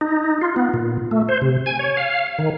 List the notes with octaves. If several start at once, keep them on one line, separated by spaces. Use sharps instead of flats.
D#4
F4
B3
A#2
A3
C5
C3
G#5
C#5
F5
D#3